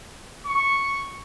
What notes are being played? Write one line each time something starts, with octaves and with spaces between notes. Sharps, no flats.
C#6